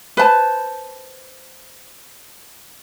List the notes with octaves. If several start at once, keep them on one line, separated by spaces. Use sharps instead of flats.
B4 C5 A5